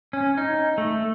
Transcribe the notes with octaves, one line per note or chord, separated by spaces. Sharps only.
C#4
D#4
A3